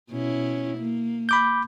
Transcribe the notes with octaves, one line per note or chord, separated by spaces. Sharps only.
B2 C#4 E4
A#3
B5 D6 G6